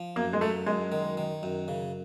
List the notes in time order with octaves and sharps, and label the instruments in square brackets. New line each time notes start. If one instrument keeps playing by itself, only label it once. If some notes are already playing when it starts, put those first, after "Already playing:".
Already playing: [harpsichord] F3
[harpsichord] F#2 [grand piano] A#3
[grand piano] G#3
[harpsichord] F#3 [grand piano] A3
[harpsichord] F#2 [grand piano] G#3
[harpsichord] D#3
D#3
F#2
C#3